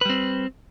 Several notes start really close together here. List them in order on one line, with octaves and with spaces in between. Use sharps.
B4 G3 C4